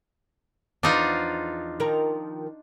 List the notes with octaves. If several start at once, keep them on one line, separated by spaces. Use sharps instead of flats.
E2 F3 D4 D#4 F4
D#3 F3 A#4